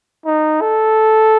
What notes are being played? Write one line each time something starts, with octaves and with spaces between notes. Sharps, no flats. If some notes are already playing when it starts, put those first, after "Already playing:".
D#4
A4